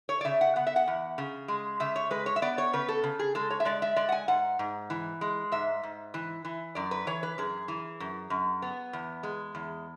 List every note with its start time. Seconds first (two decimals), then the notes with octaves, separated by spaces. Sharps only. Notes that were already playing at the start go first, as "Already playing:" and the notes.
0.09 C#5
0.21 D5
0.25 C#3 E5
0.41 F#5
0.56 B3 F#5
0.67 E5
0.76 F#5
0.88 E2
1.18 C#3
1.48 G#3
1.80 C#3 E5
1.96 C#5
2.11 G#3 B4
2.26 C#5
2.36 E5
2.42 B3 D5
2.58 C#5
2.73 C#3 B4
2.88 A4
3.04 C#3
3.19 G#4
3.35 G#3 A4
3.50 C#5
3.60 E5
3.65 G#3 D5
3.82 E5
3.96 G#3 D5
4.09 F#5
4.12 G#5
4.28 G#2 F#5
4.59 G#2
4.90 E3
5.21 G#3
5.52 G#2 E5
5.83 G#2
6.14 E3
6.45 E3
6.75 F#2 D5
6.91 B4
7.07 E3 C#5
7.23 B4
7.38 F#2 G#4
7.68 E3
8.00 F#2
8.30 F#2
8.62 B3
8.93 E2
9.23 G#3
9.55 E2